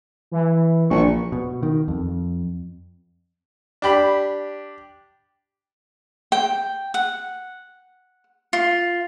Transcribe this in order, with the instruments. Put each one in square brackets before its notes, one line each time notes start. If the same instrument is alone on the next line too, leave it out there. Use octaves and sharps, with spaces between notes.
[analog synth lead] E3
[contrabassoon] A#1 [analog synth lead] C#6
[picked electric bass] B2
D#3
F2
[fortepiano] D4 G4 B5
[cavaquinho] G5
F#5
F4